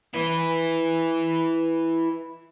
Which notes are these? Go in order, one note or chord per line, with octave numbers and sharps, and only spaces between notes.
E4 B4